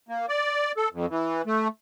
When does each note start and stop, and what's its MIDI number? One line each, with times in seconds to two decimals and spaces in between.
0.09 0.26 58
0.29 0.72 74
0.77 0.88 69
0.92 1.06 41
1.10 1.42 52
1.47 1.68 57